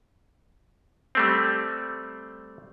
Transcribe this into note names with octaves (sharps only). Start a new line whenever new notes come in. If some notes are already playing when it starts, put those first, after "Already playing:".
G3 A3 C4